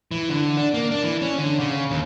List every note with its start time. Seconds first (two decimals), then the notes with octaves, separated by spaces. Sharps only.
0.11 E3
0.29 D3
0.57 D4
0.74 A#3
0.91 D4
1.03 E3
1.22 C#4
1.38 D3
1.60 C#3
1.91 D#2